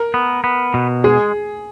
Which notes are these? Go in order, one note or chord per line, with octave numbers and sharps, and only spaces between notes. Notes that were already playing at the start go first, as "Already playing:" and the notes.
Already playing: A#4
B3
B3
B2
G#3 G#4